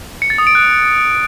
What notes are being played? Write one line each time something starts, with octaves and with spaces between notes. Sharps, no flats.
C#7
A6
D#6
D7
F#6